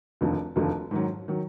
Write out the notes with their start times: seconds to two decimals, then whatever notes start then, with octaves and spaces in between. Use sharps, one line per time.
0.21 F1 D#2 D3 F3 A3
0.56 F1 D#2 D3 F3 A3
0.91 G#2 D#3 F#3
1.28 D#3 F#3